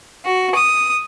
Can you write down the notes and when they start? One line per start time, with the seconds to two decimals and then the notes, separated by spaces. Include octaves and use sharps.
0.24 F#4
0.54 D#6